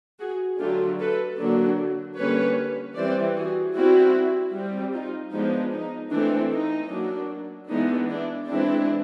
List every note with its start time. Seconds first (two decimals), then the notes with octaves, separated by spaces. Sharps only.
0.19 F#4 G#4
0.59 D3 F#3 A3 D4 F4 G4
0.98 A4 B4
1.38 D3 F#3 A#3 D4
2.17 D3 G3 A#3 C#4 B4 C#5
2.95 E3 G3 C4 C5 D5
3.35 F#4 G#4
3.74 G3 C4 E4 F#4
4.54 G3 C4
4.93 D#4 F4
5.32 F3 G#3 B3 D4 D#4
5.72 D#4
6.11 E3 A3 C4 D4
6.51 D#4
6.90 F#3 A#3 D4
7.69 E3 G#3 B3 D4 D#4
8.09 D4 E4
8.48 E3 G#3 C4 D4 E4